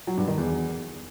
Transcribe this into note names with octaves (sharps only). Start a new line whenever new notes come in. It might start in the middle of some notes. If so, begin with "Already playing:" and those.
F#3
G2
D#3
E2